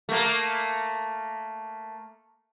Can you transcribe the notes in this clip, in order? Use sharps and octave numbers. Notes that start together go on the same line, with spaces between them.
A3 A#3